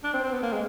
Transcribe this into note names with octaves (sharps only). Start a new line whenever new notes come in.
D4
C4
C4
B3
A#3
G#3